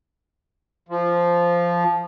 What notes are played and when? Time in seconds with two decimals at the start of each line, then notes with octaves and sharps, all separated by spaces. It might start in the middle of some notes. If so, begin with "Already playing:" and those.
0.89 F3